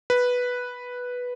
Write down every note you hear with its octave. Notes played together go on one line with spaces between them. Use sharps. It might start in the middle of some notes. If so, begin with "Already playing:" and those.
B4